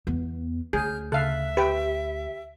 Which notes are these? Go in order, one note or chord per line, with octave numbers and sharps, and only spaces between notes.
E2 B3
D2 G#4 F6 G6
C#3 A4 E5 F5 F#6
G4 B4 G5